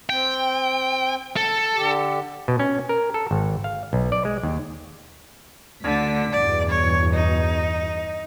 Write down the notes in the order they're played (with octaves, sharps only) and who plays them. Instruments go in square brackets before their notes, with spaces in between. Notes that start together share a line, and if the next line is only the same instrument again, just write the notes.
[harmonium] C4 [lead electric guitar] G5
[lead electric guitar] A4
[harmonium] D3 G4
[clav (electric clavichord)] B2
C#4
A#4
A4
G#1
F5
B1
D5
G#3
D#2
[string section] D2 D4 B6 [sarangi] D3
[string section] E2 G2 B2 [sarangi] D5
[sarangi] C#5
D#4